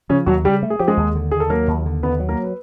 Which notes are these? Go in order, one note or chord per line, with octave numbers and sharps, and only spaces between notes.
C#3 F3 C#4
D#2 F#3 F#4
C#3 G3 G4
A3
G#4
F3 G4
G#3 G#4
D#2
D3
D#2 G#4
A4
F#3 A#3 A#4
D#2
D3
D#2 B3 B4
F#3
A#3 A#4
B4